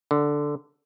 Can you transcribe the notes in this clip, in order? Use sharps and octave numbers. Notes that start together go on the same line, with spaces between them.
D3